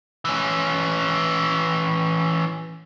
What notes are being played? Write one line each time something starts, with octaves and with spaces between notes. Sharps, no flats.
E3 C#4